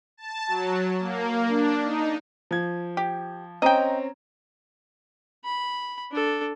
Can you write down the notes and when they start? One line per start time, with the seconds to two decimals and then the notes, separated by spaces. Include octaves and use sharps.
0.17 A5
0.48 F#3
1.00 A#3
1.48 D4
1.84 D#4
2.51 F3 G#6
2.97 G4
3.62 C4 C#4 D#5 G5 A#5
5.45 B5
6.12 D4 A4